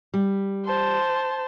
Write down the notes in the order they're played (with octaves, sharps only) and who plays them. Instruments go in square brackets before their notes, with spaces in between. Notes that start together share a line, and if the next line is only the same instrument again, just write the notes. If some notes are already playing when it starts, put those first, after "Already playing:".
[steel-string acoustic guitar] G3
[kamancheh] C5 A5